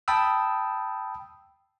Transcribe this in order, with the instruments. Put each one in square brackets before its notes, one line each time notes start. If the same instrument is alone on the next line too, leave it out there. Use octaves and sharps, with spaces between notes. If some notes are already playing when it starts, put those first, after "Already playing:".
[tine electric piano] G5 A5 B5 D#6 E6